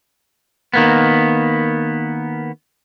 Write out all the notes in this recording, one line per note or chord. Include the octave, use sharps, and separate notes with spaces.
D#3 A#3 B3